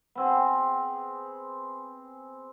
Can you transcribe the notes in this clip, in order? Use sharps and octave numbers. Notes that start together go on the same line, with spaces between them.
B3 C4 G#4